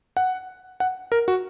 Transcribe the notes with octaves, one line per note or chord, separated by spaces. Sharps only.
F#5
F#5
A#4
F#4